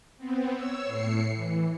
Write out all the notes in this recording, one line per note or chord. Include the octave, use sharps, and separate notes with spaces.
B3 C4
C#5 E6
A2 C7 C#7
E3